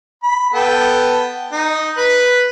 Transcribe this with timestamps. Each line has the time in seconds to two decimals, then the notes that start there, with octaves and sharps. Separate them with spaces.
0.23 B5
0.54 B3 A4 G5
1.52 D#4
1.98 B4